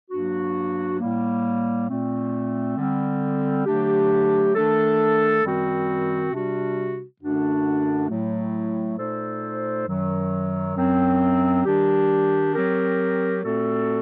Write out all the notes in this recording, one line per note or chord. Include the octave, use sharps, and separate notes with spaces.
G2 F#3 A#3 D4 F#4
A2 G3 A#3
A#2 A3 C4
D3 G3 C4
D3 F#3 A3 D4 G4
D#3 A3 D4 A4
F#2 D#3 G3 C4 F#4
C3 G3 D4 F#4
F#2 D3 A3 D4 F#4
A2 F#3 A3
A#2 A3 D#4 A4 C5
F#2 D#3 F#3
F#2 F#3 C4
D#3 G3 D4 G4
F#3 C4 G4 A#4
A#2 A3 C4 F#4 A4